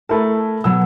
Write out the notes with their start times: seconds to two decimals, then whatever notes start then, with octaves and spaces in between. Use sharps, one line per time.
0.09 A3 E4 A#4 A5
0.64 B2 F#3 B3 E6